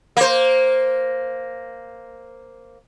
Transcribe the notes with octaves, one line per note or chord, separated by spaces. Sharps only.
A#3 C5